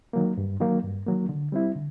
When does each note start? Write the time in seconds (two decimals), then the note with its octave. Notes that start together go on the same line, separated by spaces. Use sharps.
0.13 D#3 F#3 A#3
0.38 G2
0.60 D#3 F#3 A#3
0.83 G2
1.07 D#3 F#3 A#3
1.29 D3
1.52 G3 C4 E4
1.75 D3